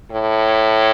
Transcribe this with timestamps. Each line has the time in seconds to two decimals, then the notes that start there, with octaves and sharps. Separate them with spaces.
0.11 A2